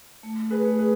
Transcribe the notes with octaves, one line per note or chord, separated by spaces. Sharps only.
A3
G#4 B4
A3
G#4 B4